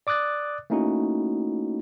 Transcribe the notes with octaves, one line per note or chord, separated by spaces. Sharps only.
D5 D6 D#6 F#6 A6
A3 A#3 C#4 D#4 E4 F#4